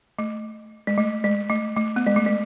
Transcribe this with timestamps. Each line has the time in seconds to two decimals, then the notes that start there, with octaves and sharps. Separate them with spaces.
0.19 A3
0.87 G#3
0.98 A3
1.24 G#3
1.50 A3
1.76 A3
1.96 B3
2.07 G#3
2.16 A3
2.26 G#3